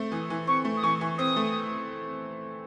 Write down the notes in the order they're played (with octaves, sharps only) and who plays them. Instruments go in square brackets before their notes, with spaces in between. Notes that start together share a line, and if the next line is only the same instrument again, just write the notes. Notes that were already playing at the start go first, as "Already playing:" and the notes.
Already playing: [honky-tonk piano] A3 C4
[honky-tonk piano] E3 [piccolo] D#6
[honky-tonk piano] E3
[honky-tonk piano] C4 [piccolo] C#6
[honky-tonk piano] A3
[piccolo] D#6
[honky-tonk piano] E3 [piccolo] C#6
[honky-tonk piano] E3
[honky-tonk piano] C4 [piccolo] D#6
[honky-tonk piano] A3